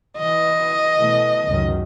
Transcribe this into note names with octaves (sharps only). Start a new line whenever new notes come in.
E3 D#5
B2 E3 A3
C#2 F#2 D#3